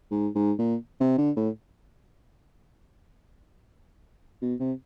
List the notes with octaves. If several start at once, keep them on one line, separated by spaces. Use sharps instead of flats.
G#2
G#2
A#2
C3
D3
A2
B2
C3